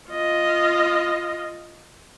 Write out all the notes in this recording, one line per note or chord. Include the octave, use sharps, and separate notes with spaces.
F4 D#5